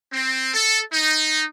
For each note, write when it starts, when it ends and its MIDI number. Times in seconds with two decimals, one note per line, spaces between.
0.12 0.52 60
0.53 0.78 69
0.92 1.43 63